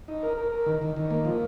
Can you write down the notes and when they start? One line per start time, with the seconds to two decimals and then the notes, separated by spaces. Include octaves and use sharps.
0.08 D#4
0.23 A#4
0.37 A#4
0.52 A#4
0.66 D#3
0.81 D#3
0.96 D#3
1.11 A#3
1.25 F3